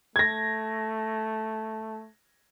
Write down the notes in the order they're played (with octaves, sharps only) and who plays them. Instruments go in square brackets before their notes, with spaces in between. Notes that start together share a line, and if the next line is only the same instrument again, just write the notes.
[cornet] A3 [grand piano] G#6 A#6